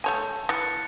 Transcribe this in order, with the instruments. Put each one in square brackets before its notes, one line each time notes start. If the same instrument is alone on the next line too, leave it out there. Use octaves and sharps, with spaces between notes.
[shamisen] A3 C#5 G#5 [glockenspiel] A5 G6
[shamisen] E3 [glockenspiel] F#6 A6 C#7